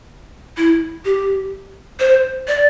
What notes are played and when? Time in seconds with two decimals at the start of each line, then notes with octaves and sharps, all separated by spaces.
0.57 E4
1.05 G4
2.00 C5
2.48 D5